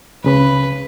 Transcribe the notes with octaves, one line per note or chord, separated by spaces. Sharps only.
C#2 C#3 B4 B5